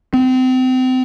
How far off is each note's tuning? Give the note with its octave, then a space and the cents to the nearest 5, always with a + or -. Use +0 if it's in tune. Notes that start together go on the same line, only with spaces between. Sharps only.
C4 -30